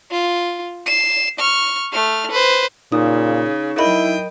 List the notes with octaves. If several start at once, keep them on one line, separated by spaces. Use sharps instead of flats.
F4
C7 E7
C#6 F6
A3 F6
B4 C5
A#2 C#3 D#4 D#6
F#3 E4 A#4 D#5 G5 B5 D#6